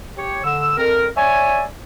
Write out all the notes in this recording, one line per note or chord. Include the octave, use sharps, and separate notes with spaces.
G4 C#5
D3 E6
F2 A#4
C#5 D5 E5 G#5